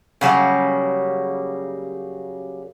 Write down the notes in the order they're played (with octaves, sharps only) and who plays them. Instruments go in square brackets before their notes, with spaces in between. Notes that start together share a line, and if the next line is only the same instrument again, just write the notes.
[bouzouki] C#3 F#3 G3 A#3